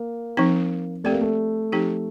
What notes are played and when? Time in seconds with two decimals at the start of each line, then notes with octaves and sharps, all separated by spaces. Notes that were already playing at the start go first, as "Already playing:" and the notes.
Already playing: A#3
0.37 F3 C4 D#4
1.04 A3 C4 G4 D5
1.12 A#3
1.21 A3
1.72 F3 C4 D#4 G4